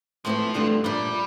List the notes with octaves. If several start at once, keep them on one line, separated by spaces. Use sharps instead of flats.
A2 E3 F3 A3 C4 E4
G2 D3 A3 C4 F4
A#2 F3 G3 A3 D4